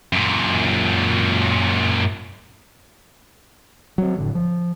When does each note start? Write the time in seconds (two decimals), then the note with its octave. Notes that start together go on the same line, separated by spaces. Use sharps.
0.13 F#2 A#2
3.98 F#3 C4
4.18 F1 A2 D3
4.35 F3